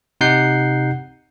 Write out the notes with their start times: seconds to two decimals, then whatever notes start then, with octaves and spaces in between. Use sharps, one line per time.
0.21 C3 D#4 F#5 G6 C7